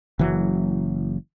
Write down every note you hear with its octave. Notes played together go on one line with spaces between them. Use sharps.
F#1 E3 F#3